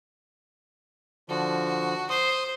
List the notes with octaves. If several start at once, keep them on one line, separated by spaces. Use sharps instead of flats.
D3 F3 F#4
C5 C6 D#6